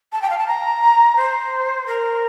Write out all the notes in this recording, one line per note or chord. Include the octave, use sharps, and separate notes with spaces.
A5
G5
F5
A5
A#5
C5
A#4